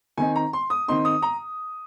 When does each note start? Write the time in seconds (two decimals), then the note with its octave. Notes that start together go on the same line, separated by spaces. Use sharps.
0.17 D#3 C4 D#4 G#5
0.36 A#5
0.53 C6
0.70 D#6
0.88 D#3 C4 D#4 C6
1.05 D#6
1.22 A#5